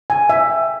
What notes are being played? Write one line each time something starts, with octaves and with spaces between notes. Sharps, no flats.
G#5
E5
G#5
G5